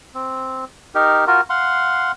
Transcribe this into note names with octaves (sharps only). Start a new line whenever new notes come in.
C4
D#4 G4 A#4
F4 F#4 A#4
F5 F#5 C6